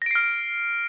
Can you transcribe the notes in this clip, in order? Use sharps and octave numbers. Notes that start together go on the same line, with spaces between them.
F6 A#6 C7 D7